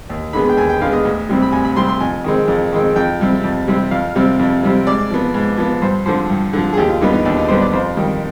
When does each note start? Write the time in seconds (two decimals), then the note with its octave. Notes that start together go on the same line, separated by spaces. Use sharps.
0.09 D#2
0.33 D3 G#3 B3 B5
0.49 G5
0.57 D#2 G#5
0.69 G5
0.81 D3 G#3 B3 F5
0.93 D#5
1.05 D2
1.29 C3 G3 C4
1.42 B5
1.52 D2 G#5
1.65 B5
1.76 C3 G3 C4 C6
1.88 C6
2.00 F2 G#5
2.24 D#3 G#3 C4
2.48 F2
2.72 D#3 G#3 C4
2.96 F2 G5
3.20 C3 G3 C4
3.44 F2
3.67 C3 G3 C4
3.91 F2 F5
4.15 C3 G3 C4
4.39 F2
4.63 C3 G3 C4
4.86 G#2 D5
5.11 F3 B3
5.34 G#2
5.58 F3 B3
5.82 G2 C5
6.06 D3 F3 C5
6.30 G2
6.53 D3 F3
6.73 G#4
6.77 D#2 G4
6.89 F4
7.01 D3 G3 B3 D#4
7.13 D#4
7.25 D#2 D4
7.37 D#4
7.48 D3 G3 B3 C5
7.61 D5
7.73 F2 C5
7.97 D#3 G3